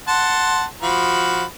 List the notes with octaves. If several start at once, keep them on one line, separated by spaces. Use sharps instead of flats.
F#5 A5 C6
F3 F#4 B5